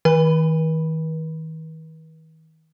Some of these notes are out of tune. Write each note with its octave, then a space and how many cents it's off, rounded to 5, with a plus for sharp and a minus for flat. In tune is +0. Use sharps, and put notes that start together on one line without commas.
D#3 +40 B4 -40 B5 +0